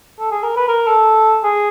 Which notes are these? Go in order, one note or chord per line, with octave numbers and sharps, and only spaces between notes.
A4
G#4
A#4
B4
A#4
A4
G#4